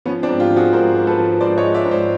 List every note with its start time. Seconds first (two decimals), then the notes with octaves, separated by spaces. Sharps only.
0.05 F3 B3 C#4
0.23 C4 D4
0.28 G#2
0.40 F4 G4
0.50 F3
0.57 F#4 G#4
0.73 G#2 A#4 C5
0.96 G#2
1.07 A4 B4
1.18 F3
1.40 G#2 C5 D5
1.57 C#5 D#5
1.64 G#3
1.74 D5 E5
1.86 G#2
1.91 C5 D5